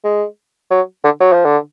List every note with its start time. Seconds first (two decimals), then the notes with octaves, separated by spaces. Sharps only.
0.04 G#3
0.71 F#3
1.04 D3
1.21 F#3
1.33 F3
1.45 D3